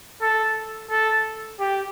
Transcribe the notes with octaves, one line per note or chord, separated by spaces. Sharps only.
A4
A4
G4